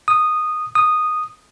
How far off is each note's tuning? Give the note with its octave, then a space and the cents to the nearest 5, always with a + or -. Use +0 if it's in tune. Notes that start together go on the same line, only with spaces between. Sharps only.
D#6 -10
D#6 -10